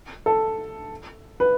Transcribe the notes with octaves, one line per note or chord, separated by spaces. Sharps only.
A4
B4